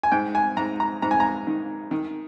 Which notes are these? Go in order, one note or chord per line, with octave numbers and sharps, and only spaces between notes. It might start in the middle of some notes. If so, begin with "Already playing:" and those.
G#5
G#2 G5
G#5
G#2 A#5
A#5
G#2 A#5
G#5
A#5
D#3
D#3